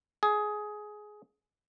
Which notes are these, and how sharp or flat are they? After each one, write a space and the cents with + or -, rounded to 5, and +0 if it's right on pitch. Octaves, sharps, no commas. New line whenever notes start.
G#4 +15